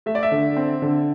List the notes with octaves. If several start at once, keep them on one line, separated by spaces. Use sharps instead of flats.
A3 E5
D5
E5
D3
C4
D3